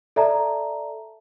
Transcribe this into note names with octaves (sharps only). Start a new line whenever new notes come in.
A4 D5 E5 A5 A#5